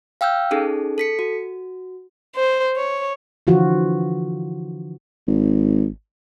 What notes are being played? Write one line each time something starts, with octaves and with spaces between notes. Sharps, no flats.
F5 G5 E6 F6 G6
C#4 D#4 G#4 A4
A4 B6 C#7
F#4
C5
C#5
D3 E3 F3 F4 F#4
G#1